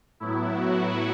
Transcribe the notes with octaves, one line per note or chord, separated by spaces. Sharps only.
A2 F#3 B3 E4
F#4